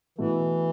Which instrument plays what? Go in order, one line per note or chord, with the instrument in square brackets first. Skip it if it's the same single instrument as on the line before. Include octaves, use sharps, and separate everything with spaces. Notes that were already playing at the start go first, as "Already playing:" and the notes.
[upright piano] B2 A3 E4 [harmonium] E3